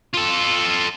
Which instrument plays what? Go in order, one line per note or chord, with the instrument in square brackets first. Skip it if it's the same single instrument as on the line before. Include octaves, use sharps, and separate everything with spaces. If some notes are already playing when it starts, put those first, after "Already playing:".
[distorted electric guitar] F4 A4